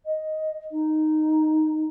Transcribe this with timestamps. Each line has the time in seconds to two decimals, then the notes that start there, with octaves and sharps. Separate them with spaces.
0.06 D#5
0.71 D#4